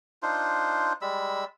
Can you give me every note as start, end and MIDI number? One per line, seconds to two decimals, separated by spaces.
0.23 0.93 62
0.23 0.93 63
0.23 0.93 65
0.23 0.93 72
1.02 1.45 55
1.02 1.45 56
1.02 1.45 83
1.02 1.45 88